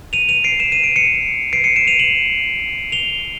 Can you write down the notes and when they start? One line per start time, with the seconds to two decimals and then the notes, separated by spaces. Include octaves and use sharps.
0.13 D#7 F7
0.29 D#7 F7
0.44 C7 D7
0.60 E7
0.72 D#7
0.84 D7
0.96 C#7 D#7
1.53 C7 D7
1.64 C#7 D#7
1.76 D7 E7
1.87 D#7 F7
1.99 E7 F#7
2.92 F7 G7